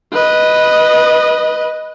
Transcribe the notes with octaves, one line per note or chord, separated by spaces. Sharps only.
B4 D#5